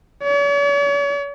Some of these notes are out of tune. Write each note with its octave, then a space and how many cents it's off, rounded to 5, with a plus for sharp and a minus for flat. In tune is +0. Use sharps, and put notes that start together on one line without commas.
C#5 +45